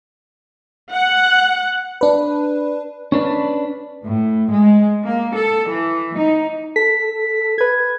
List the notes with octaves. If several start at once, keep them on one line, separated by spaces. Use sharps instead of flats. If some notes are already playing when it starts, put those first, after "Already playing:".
F#5
D4 B4
C#4 D4 B4
A2
G#3
A#3
A4
E3
D#4
A4 B6
B4 G#6